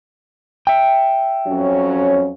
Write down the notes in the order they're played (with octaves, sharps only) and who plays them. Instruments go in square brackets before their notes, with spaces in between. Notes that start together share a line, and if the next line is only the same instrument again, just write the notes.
[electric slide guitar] E5 G5
[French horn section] F2 F#3 C#4